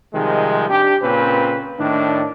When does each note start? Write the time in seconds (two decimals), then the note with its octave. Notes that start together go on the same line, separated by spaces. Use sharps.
0.14 C3 D#3 F3 G3 G#3
0.70 D4 G4
1.02 A#2 C#3 C4 C#4 B4
1.79 A2 D#3 D4